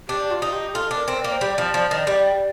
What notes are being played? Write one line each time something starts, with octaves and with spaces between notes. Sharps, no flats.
D4 G4
F4
D#4
G4
F4 A4
D4
A#4
C4
D5
A#3
C5
G3 D5
F3
F3
D#3
G3